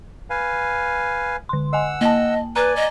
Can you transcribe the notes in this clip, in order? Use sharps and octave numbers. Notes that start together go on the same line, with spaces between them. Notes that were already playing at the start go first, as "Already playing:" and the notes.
B4 F5 G#5
D3 C6
D#5 F#5 G#5 E6
A#3 D#5 A5
B4 D5 G#5 A#5
D#5